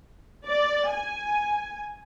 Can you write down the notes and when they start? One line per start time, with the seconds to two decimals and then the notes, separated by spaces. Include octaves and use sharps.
0.45 D5
0.90 G#5